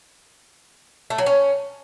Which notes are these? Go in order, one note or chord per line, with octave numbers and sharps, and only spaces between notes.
A3
F#3
C#4